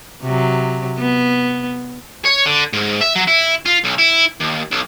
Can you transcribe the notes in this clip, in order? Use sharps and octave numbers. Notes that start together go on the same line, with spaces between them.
C3 F#3
B3
C#5
D3
G#2
E5
F#3
E4
F4
B1
E4
D#2
B1